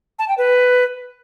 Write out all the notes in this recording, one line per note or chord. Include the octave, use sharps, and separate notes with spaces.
A5
G5
B4